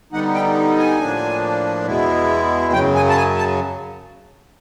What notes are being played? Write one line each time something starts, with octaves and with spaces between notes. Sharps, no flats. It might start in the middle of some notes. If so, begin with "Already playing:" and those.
D3 G3 B3 D#4 F#5
G5
G#5
A2 F3 A#3 D4
E2 B2 G#3 B3 E4
F#2 C#3 F#3 G5
G#5
A5
G#5
A5